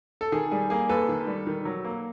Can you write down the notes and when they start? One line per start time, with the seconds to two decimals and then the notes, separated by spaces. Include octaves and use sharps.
0.21 A4
0.32 D#3 G#4
0.51 G3 G#4
0.70 A#3 G#4
0.89 D#2 A4 B4
1.09 D#3
1.27 G3
1.47 D#3
1.65 F#3
1.85 A#3